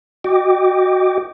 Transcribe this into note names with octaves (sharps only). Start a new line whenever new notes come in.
F#4 D#5 G5 D6